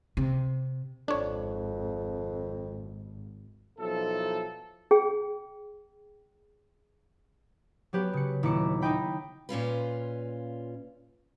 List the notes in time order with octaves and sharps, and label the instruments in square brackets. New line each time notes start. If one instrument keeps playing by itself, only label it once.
[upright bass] C3
[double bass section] G#1 [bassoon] F2 [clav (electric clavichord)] D4 C#5
[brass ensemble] B1 F3 D#4 E4 A4
[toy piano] G#4 G5
[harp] F#3 B3 C#4 G4 B4
C#3 C#7
D#1 E4 E5 A#5 D6 C#7
D#4 E4 D#5 G5 B5
[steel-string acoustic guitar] A#2 C#4 F4 B4